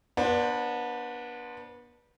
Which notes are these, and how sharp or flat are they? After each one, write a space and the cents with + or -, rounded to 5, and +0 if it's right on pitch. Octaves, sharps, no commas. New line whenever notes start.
B3 -30 D4 +10 C5 +0